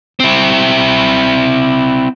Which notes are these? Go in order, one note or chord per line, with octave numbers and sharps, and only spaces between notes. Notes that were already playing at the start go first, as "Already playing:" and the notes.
C4 E4